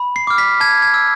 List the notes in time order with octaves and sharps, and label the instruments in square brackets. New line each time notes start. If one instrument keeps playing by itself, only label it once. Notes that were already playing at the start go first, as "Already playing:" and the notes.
Already playing: [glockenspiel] B5
C7
D6 F6
B6
A5 G#6
G#6
E6